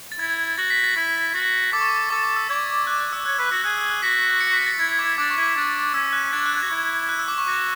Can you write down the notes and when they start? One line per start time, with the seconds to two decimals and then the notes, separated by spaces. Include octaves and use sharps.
0.12 A6
0.19 E4 G#6
0.58 F#4 A6
0.70 B6
0.84 A6
0.96 E4
1.34 F#4
1.73 A4 D6
1.81 C#6
1.89 D6
2.10 A4 D6
2.24 D6
2.36 E6
2.49 D5 G#6
2.87 F#6
3.00 F#6
3.13 E6
3.25 C#5 F#6
3.38 B4 E6
3.46 F#6
3.51 F#4 E6
3.64 G#4 F#6
3.77 E6
3.90 F#6
4.02 F#4 B6
4.41 C#7
4.54 B6
4.66 A6
4.79 E4 G#6
4.99 D6
5.18 D4 D6
5.30 C#6
5.37 E4
5.43 D6
5.56 D4
5.94 C#4 E6
6.13 F#6
6.32 D4 G#6
6.46 F#6
6.57 F#4 G#6
6.71 E4
7.09 F#6
7.19 E6
7.28 D6
7.38 C#6
7.47 F#4 D6